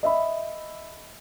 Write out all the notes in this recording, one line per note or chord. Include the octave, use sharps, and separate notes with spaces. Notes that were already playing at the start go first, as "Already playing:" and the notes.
D#5 E5 B5